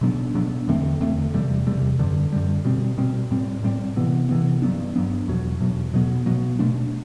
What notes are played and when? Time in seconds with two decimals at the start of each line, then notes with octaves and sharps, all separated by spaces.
0.01 B2 F#3 B3 D4
0.34 B2 F#3 B3 D4
0.68 E2 D3 A3 C4
1.01 E2 D3 A3 C4
1.34 E2 C3 G3
1.67 E2 C3 G3
1.99 F#2 D3 G3
2.33 F#2 D3 G3
2.65 B2 G3 C4
2.98 B2 G3 C4
3.31 A2 G3 C4
3.63 A2 G3 C4
3.96 C3 E3 B3
4.29 C3 E3 B3
4.62 G2 F#3 B3 D4
4.96 G2 F#3 B3 D4
5.28 E2 B2 F#3
5.61 E2 B2 F#3
5.94 B2 F#3 B3
6.26 B2 F#3 B3
6.59 B2 A3 D4